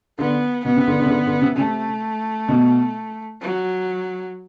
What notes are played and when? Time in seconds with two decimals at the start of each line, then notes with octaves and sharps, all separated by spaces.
0.19 D3 B3
0.65 B2 B3
0.76 C3
0.87 D3
1.00 D3
1.06 C3
1.10 D3
1.26 D3
1.42 C3
1.57 C3 A3
2.49 B2
3.41 F#3